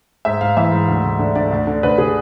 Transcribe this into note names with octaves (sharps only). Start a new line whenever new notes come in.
G#2 E5
G#2 F5
E3 E5
G#2
D2
D2
D3
D3 D5
D2
D3
D2 B4
D3 G#4